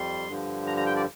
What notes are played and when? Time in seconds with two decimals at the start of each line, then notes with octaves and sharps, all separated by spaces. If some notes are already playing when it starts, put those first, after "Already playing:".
Already playing: F2 G3 C6
0.28 G2 D3 F3
0.67 A#5
0.77 A#5
0.86 G5
0.96 D5